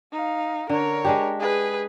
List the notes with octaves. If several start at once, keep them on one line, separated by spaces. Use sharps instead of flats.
D#4 F5
D3 A#4 C#5
G#3 D4 G4
G#4 B4